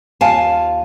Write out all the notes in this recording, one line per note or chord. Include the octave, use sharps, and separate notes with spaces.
D#2 F4 F5 G#5 A5